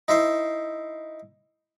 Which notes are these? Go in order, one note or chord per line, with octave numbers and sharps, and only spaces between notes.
D#4 E4 C5